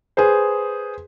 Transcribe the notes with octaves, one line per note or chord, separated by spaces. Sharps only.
G#4 B4 C5